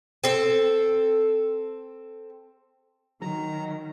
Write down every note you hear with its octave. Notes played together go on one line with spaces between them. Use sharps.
C4 A4
D#3 F#3 D#4 A#5